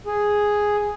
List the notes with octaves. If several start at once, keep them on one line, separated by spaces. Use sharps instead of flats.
G#4